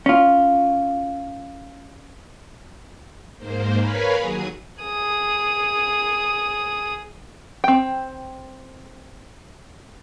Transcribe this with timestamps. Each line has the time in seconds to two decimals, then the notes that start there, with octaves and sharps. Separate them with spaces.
0.06 C#4 F4
3.37 G#2 A#3 C5
3.79 A#4 B4 C#5 F5 G#5 B5
4.19 D#2 F#3 G#4 D#6
4.83 G#4 D#6
7.64 C4 G5